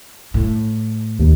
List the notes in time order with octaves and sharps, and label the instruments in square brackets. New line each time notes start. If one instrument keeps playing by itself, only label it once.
[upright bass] A2
[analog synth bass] D#2